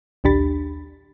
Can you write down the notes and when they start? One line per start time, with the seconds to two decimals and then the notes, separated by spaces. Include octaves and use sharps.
0.24 A#1 D#2 D4 G4 B5 A6